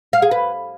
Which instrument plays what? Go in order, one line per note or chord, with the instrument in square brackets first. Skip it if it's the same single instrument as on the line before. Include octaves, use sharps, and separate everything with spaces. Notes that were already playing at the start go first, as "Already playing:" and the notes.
[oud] F5
G#4
B4